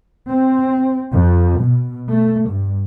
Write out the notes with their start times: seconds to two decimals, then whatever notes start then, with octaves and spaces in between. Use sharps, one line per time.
0.28 C4
1.11 F2
1.63 B2
2.10 A3
2.48 G2